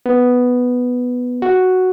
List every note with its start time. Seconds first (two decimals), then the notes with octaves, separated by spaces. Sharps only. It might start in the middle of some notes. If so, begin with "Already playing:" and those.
0.06 B3
1.42 F#4